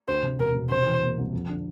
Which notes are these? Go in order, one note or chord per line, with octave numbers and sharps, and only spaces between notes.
D2 C5
C3
E1 A#4
E1
C3 C5
E3
A#3
C2
F2
D3